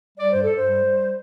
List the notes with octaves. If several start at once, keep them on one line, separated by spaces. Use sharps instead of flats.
G3 D5
G2 C5
A4
G2
C5
G3
G3